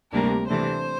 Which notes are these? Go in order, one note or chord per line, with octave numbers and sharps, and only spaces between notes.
D2 C3 G3 A#3 D4 A#4
C3 E3 A3 D4 C5